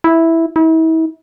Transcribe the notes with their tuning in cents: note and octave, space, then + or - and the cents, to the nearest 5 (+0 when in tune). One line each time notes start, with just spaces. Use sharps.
E4 -5
E4 -40